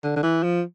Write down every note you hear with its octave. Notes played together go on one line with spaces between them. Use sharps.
D3
D3
E3
F3